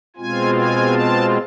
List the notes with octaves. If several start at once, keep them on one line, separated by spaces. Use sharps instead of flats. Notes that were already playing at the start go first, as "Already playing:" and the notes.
B2 G#3 C4 F4 G#5
G#5
A5